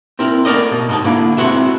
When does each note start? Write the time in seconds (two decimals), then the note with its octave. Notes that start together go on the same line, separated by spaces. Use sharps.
0.19 C4 E4 A#4
0.45 A3 B3 A#4 D5 D#5
0.72 B2
0.89 G#2 D#5 A5
1.05 D3 A#3 E4
1.37 G#3 C4 E4 F#4 E5